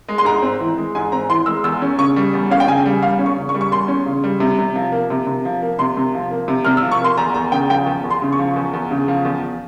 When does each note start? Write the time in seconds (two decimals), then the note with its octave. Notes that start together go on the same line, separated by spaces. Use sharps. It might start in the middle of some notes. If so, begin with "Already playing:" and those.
0.09 G#3
0.18 C6
0.25 G#2 A#5
0.42 C4
0.60 E3
0.78 G#3
0.95 G#2 G#5
1.12 C4 A#5
1.29 E3 C6
1.46 G#3 E6
1.64 E2 E6
1.82 C#4
1.98 C#3 C#6
2.16 G3
2.34 E2
2.51 C#4 F5
2.60 G5
2.67 C#3 G#5
2.86 G3
3.02 E2 F5
3.19 C#4
3.26 C#6
3.36 C#3
3.49 C#6
3.54 G3
3.61 C#6
3.71 E2 C6
3.88 C#4
4.06 C#3
4.24 G3
4.40 C3
4.59 C3
4.75 F3
4.92 A#3
5.10 C3
5.27 C3
5.45 F3
5.62 A#3
5.79 C3 C6
5.97 C3
6.14 F3
6.31 A#3
6.48 C3
6.65 C3 F6
6.77 E6
6.83 F3
6.92 C#6
7.01 A#3 C6
7.17 E2 A#5
7.34 E2 A#5
7.52 C#3 G5
7.70 F3 G5
7.86 E2
8.04 E2
8.10 C6
8.22 C#3
8.33 C#6
8.39 F3
8.56 E2
8.73 E2
8.91 C#3
9.08 F3
9.25 E2